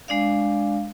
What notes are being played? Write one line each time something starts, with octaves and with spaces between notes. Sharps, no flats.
G#3 D4 D5 F5